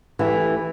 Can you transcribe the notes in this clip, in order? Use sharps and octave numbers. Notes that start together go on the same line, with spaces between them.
E3 A3 E4 G4